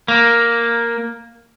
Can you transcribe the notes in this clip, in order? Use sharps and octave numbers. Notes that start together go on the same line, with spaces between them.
A#3